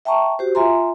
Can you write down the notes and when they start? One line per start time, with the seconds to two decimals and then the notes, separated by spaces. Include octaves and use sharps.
0.05 E5 G5 A5 A#5 C#6
0.39 F#4 G4 C5
0.55 F4 E5 G#5 A#5 C6